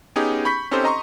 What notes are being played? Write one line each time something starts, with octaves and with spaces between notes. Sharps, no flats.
B3 C#4 D#4 G4 G#4
B5 C#6 G6 B6
C4 C#4 D#4 G4 A4 C5
D#5 A#5 C6 C#6